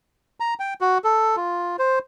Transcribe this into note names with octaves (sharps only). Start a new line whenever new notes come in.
A#5
G5
F#4
A4
F4
C5